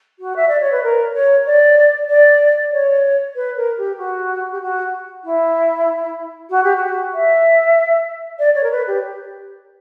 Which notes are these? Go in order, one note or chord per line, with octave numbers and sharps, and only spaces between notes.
F#4
E5
D5
C#5
B4
A#4
C#5
D5
D5
C#5
B4
A#4
G4
F#4
G4
F#4
E4
F#4
G4
F#4
E5
D5
C#5
A#4
B4
G4